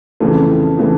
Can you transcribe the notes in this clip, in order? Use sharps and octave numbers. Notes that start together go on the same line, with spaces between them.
F2 C#3 E3 A3
C#3 E3 A3